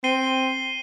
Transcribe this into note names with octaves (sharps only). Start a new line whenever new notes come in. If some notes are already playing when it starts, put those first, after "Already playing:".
C4 C7 D#7 G7